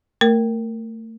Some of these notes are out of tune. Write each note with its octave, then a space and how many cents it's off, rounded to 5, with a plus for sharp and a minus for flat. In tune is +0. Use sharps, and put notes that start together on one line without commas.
A3 +30 A#4 -5